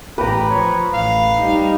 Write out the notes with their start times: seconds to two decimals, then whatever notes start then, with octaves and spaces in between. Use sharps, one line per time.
0.18 A1 G4 B4 A#5
0.50 F3 C#5
0.94 A1 F5
1.39 G3 D#4